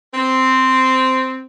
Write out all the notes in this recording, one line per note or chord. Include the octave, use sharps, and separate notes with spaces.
C4